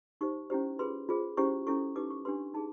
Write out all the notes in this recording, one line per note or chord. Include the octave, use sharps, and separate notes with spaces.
D#4 G4 C5 C#6
C#4 E4 G4 C5
F4 G#4 B4 C6
F4 G#4 C5
C#4 E4 G4 C5 C#6
C#4 E4 A4 C#6
D#4 G4 B4 D6
C#6
D4 G4 B4 C6
D#4 G#4 A5